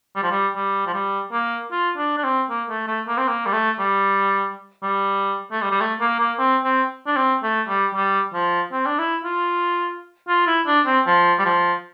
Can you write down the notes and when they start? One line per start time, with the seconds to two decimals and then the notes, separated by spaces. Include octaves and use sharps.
0.16 G3
0.23 F3
0.31 G3
0.55 G3
0.87 F3
0.94 G3
1.32 A#3
1.72 F4
1.97 D4
2.18 D4
2.24 C4
2.50 A#3
2.70 A3
2.88 A3
3.07 A#3
3.18 C4
3.28 A#3
3.46 G3
3.53 A3
3.79 G3
4.83 G3
5.52 A3
5.62 G3
5.72 G3
5.80 A3
6.01 A#3
6.20 A#3
6.39 C4
6.64 C4
7.07 D4
7.16 C4
7.43 A3
7.68 G3
7.94 G3
8.34 F3
8.72 C4
8.86 D4
8.99 E4
9.24 F4
10.28 F4
10.47 E4
10.67 D4
10.86 C4
11.06 F3
11.39 G3
11.46 F3